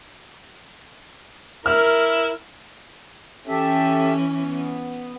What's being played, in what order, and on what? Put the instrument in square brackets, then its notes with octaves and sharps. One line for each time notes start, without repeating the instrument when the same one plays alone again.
[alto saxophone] E4 [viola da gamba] A#4 [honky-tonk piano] F6
[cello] E3 C#4 [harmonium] G4 A4 E5
[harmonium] B3